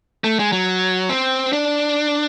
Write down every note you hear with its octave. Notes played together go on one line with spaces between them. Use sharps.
A3
G#3
F#3
C4
D4